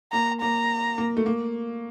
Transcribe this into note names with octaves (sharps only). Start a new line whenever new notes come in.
A#3 A#5
A#3 A#5
A#3
A3
A#3